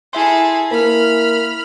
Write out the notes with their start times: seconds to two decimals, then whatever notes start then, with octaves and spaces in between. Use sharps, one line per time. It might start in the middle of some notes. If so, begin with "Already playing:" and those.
0.13 E4 G#4 A4 E5 C6
0.71 A#3 B5 F6